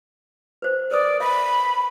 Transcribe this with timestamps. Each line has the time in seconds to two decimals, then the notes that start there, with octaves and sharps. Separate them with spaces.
0.62 B4 C5
0.91 A#4 B4 D5 D#6
1.20 E5 B5